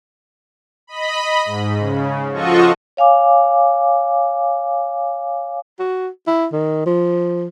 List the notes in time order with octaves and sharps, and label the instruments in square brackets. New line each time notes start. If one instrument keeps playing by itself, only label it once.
[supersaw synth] D#5 B5
G#2
C#3
F3 F4 F#4 A4 D#5 C#6
[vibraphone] C#5 F5 G#5 D6
[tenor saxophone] F#4
E4
D#3
F3